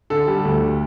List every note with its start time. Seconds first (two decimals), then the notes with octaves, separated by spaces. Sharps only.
0.10 D3 A4
0.27 G3
0.45 D2